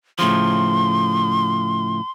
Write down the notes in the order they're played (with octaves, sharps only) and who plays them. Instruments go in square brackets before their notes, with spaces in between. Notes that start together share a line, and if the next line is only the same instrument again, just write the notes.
[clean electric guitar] A2 C#3 F3 [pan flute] C6